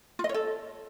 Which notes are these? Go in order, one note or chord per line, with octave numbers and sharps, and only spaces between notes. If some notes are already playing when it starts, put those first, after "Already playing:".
F4
D#5
C#5
A4